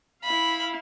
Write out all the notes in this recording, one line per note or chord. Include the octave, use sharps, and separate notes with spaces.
E4 F5 B5